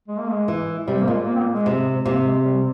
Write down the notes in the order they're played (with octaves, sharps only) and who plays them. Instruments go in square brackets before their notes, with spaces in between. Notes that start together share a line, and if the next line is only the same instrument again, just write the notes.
[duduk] G#3
A#3
G#3
[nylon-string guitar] E3
[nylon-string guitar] C3 [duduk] G3
[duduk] A#3
[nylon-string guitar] A#2 [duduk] G#3
[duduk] A#3
C4
A#3
G#3
[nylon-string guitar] C3
[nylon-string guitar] C3 [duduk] A#3
[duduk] G#3
G3